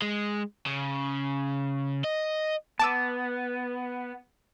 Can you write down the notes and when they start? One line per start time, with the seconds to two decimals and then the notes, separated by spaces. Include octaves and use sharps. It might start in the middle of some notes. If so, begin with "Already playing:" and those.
0.02 G#3
0.66 C#3
2.04 D#5
2.79 B3 A5 D6 E6